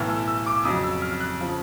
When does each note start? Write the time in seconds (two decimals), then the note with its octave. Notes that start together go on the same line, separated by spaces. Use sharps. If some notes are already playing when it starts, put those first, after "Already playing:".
Already playing: B1 A2 E3 F6
0.09 E6
0.28 E6
0.46 D6
0.65 F2 C#3 F#3 D#6
0.84 E6
1.02 F6
1.20 F#6
1.40 C#3 F3